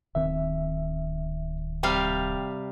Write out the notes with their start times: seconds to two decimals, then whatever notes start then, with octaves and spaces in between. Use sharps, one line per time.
0.15 D1 D#3 C4 E5
1.83 C3 G3 F5 G5